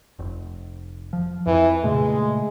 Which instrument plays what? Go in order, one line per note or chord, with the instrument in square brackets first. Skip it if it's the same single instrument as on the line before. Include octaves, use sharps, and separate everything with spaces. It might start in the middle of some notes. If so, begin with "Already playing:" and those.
[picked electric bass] F1
F3
[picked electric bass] F2 [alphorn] E3
[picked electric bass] A#2 C#3 A3 [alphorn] G#3